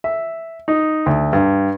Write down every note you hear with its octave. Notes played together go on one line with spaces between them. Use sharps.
E5
D#4
D2
G2